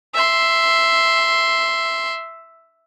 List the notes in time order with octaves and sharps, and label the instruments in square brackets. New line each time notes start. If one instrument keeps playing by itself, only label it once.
[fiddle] E5 C6